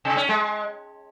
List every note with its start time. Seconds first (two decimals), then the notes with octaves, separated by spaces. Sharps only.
0.05 C3
0.17 C#4
0.29 G#3